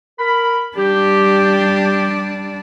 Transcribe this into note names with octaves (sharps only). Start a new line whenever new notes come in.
A#4 B5
G3 D4 G4